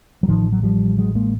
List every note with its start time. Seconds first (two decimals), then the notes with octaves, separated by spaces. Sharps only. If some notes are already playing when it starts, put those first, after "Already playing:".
0.23 F#3
0.28 A1 A2 D#3 F3
0.52 F#3
0.63 F3 G3
0.98 F#3 G#3
1.15 G#3 A#3